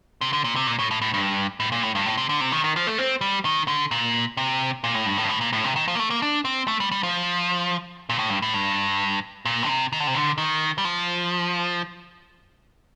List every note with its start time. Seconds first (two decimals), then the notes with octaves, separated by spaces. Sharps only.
0.21 C3
0.33 D3
0.44 A#2
0.56 C3
0.67 A#2
0.79 A2
0.91 A2
1.02 A2
1.14 G2
1.60 A2
1.72 A#2
1.83 A2
1.95 G2
2.06 A2
2.17 C3
2.29 D3
2.41 C3
2.52 D#3
2.64 D#3
2.76 F3
2.87 A3
2.98 C4
3.21 G3
3.45 D#3
3.68 D3
3.91 A#2
4.37 C3
4.84 A#2
4.95 A2
5.06 G2
5.18 A2
5.24 G2
5.29 A2
5.41 A#2
5.53 A2
5.64 C3
5.76 D#3
5.88 F3
5.95 A#3
5.99 A3
6.10 A#3
6.22 D4
6.45 C4
6.68 A3
6.80 G3
6.92 G3
7.03 F3
8.09 A#2
8.18 A2
8.30 G2
8.42 A2
8.54 G2
9.45 A#2
9.63 D3
9.69 C3
9.93 D#3
10.00 D3
10.07 C3
10.15 D3
10.38 D#3
10.78 G3
10.85 F3